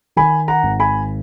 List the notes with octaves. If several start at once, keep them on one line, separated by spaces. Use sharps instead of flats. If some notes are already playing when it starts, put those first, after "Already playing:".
D#3 G#5 B5
F#5 A#5
G#1
G#5 B5